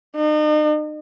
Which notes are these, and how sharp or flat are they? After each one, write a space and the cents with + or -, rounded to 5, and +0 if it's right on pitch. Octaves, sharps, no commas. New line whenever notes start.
D#4 -40